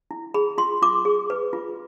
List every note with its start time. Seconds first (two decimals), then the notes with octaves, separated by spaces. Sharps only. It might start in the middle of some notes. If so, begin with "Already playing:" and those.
0.11 E4
0.34 G#4 B5
0.58 F4 C6
0.82 F4 D6
1.05 G#4
1.30 B4
1.53 F4